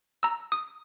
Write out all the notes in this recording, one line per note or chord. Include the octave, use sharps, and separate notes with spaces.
A#5 E6
D#6